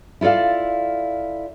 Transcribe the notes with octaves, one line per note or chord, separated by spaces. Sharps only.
E4 F4 A4 D5 F5